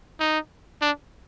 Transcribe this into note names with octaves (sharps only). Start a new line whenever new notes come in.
D#4
D4